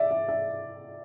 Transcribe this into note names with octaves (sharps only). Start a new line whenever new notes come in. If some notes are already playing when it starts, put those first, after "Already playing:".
Already playing: D5 E5
E5
E5